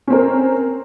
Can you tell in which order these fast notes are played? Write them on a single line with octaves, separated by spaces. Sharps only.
C#4 C4 A#4